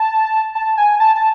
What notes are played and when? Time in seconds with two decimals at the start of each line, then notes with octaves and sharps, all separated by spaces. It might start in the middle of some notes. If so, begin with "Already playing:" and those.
Already playing: A5
0.55 A5
0.77 G#5
1.00 A5
1.15 A5